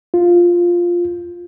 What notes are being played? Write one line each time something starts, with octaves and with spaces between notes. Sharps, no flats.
F4